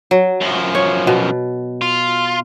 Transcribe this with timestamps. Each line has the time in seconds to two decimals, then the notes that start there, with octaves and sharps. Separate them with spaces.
0.11 F#3
0.41 F#2 F3
0.75 C#5
1.07 B2
1.82 F4